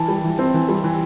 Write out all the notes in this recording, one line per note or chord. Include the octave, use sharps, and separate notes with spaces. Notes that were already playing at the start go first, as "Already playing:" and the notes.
Already playing: E3 E4 A5
G3
E3
C4
E3
G3
E3